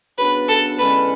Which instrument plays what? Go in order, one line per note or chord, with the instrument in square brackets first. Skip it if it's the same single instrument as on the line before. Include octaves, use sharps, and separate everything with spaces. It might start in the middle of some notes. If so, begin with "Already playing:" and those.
[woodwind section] C#3 F#3 B3 D4 [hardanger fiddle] B4
[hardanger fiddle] A4
[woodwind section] E2 D3 G#3 C#4 [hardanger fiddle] B4